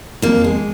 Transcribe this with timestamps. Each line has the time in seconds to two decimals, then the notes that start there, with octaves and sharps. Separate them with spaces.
0.22 F2 A#3
0.44 G#3